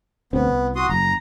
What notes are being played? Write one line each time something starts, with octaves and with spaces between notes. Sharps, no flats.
D2 B3 C4
C2
F#4 C6 D#6
F#1 A#5